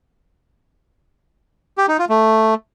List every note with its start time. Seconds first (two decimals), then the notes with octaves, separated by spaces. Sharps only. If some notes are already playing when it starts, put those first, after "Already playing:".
1.78 G4
1.88 D#4
1.99 F4
2.09 A3